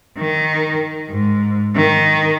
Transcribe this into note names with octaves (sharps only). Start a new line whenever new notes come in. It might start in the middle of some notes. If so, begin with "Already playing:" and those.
D#3
G#2
D#3